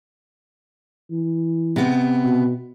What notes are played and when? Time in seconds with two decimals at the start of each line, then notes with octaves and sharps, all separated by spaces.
1.11 E3
1.76 C3 B3
2.24 B2